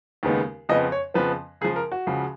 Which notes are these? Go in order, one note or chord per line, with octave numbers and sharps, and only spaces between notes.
D#2 C#3 G#3 B3 D#4
F2 C#3 F3 B3 D#5
C#5
F2 C#3 F3 B3 B4
C#2 C#3 F3 G#4
A#4
F#4
C#2 C#3 F3